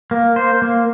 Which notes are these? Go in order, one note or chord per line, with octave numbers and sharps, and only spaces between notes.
A#3
C5
A#3